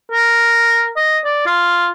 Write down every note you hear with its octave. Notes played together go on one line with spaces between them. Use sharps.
A#4
D#5
D5
F4